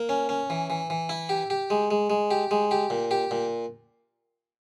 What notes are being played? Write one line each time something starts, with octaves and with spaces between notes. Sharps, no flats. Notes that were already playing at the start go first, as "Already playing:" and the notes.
Already playing: A#3
C#4
C#4
E3
E3
E3
E4
G4
G4
G#3
G#3
G#3
G4
G#3
G4
A#2
G4
A#2